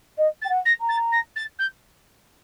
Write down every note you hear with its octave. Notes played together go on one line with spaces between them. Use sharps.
D#5
A6
G5
F#5
A#6
A#5
A6
A#6
A6
G6